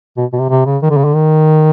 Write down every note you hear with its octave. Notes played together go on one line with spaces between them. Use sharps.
B2
B2
C3
C3
C#3
D#3
D3
C#3
D3
D#3